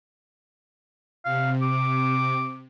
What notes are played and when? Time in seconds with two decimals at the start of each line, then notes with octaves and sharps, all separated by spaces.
1.25 C3 F5
1.62 D6